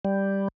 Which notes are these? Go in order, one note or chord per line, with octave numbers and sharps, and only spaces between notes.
G3